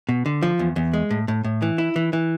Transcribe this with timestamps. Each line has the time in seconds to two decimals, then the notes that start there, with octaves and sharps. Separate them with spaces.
0.09 B2
0.26 D3
0.42 F3
0.59 E2
0.76 E2
0.93 G#3
1.11 A2
1.28 A2
1.44 A2
1.62 E3
1.78 E4
1.96 E3
2.13 E3